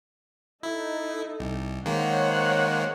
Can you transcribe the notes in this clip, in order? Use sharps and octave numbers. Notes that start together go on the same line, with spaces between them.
D#4 E4 A4
C2
D#3 G#3 A#3 C5 C#5 F#5